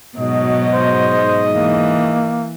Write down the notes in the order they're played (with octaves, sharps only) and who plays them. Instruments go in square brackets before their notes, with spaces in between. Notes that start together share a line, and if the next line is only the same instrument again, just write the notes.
[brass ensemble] G#2 D#5 [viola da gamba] B2 F#3
[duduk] C5
[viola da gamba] E3 [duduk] A#3